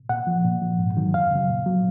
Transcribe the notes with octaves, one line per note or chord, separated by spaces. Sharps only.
A#2 F#5
F3
A#2
F3
G#2
D#3 F#3
F#2 F5
C#3 F#3
A#2
F#3